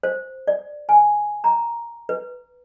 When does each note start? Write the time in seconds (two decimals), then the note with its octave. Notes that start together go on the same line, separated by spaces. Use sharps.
0.03 C5
0.47 D5
0.89 G#5
1.44 A#5
2.09 B4